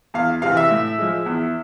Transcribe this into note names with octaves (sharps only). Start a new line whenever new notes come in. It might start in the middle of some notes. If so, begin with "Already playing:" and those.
E2 F5
C3 E3 F5
E5
A2
F3 G#3
E2